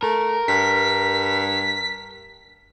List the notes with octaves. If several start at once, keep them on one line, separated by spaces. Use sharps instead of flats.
A3 A#4
G2 B6